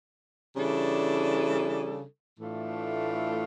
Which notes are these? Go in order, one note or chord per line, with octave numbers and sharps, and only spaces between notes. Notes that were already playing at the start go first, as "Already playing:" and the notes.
C#3 E3 G3 D4 A4
A2 E3 A3 D4 F4